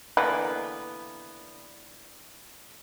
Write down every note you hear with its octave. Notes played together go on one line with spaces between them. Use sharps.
D3 E3 A#3 B3